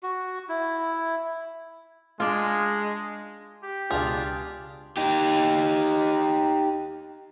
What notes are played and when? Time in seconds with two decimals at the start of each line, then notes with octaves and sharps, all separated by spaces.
0.03 F#4
0.49 E4
2.20 G#3 D4 F4
3.63 G4
3.91 C#2 B2 D4 F4 G#4 F6
4.97 D#4 G4